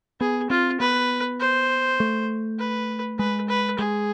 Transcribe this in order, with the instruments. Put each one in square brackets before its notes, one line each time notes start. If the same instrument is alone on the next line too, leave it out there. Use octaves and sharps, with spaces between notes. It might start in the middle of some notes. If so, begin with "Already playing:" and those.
[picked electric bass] B3 [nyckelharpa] G#4
[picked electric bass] C4 [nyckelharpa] F4
[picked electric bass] B3 [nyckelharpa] B4
[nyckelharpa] C5
[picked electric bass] A3
[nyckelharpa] B4
[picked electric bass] G#3 [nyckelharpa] B4
[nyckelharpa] B4
[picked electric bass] G#3 [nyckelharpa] G#4